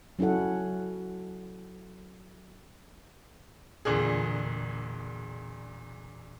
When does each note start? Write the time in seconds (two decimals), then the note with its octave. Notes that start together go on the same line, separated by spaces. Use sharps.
0.19 F#3 C#4 E4 A4 F#5
3.85 E1 A#2 D3 G#4